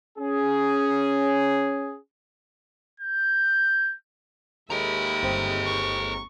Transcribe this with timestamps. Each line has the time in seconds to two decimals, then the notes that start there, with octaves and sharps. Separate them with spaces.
0.19 C#4 G#4
3.00 G6
4.70 D#2 G#3 A4 E5 A#5 B5
5.23 G1 C4
5.65 C#6